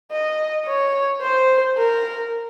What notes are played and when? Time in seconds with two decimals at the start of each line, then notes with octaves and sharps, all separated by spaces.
0.11 D#5
0.67 C#5
1.22 C5
1.77 A#4